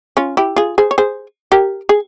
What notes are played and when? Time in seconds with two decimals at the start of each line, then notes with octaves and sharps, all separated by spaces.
0.17 C#4 F4
0.37 E4 G4
0.56 F4 G#4
0.78 G#4 C5
0.91 C#5
0.98 G#4 C5
1.52 G4 A#4
1.89 G#4